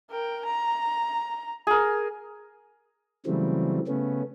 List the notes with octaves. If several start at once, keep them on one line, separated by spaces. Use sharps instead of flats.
A#4 G5
A#5
G#4 A#4
C#3 E3 F#3 G3 A3 C4
C#3 A3 B3 C#4